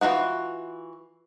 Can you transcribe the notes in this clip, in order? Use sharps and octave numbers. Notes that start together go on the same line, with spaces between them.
E3 F4 F#4 F#5